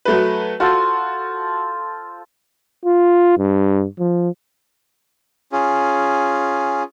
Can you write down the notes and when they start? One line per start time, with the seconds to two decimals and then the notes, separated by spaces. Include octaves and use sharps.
0.05 F#3 A3 B4
0.60 F4 F#4 A4 C5
2.85 F4
3.38 G2
3.99 F3
5.52 C#4 F4 G#4